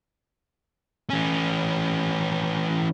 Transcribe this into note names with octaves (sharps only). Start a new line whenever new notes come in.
E3 C#4